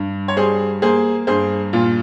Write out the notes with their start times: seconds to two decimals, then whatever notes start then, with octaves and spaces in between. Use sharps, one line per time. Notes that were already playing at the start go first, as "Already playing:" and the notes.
Already playing: G2
0.28 C#5
0.37 G3 G#4 C5
0.82 A#3 G#4 C5
1.27 G2 G#4 C5
1.73 A#2 F4